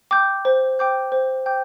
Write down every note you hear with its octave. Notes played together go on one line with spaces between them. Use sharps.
G5 D6 G6
C5
G5 D6 G6
C5
G5 D6 G6